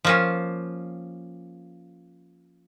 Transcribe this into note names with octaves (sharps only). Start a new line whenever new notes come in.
F3 A#3 C#4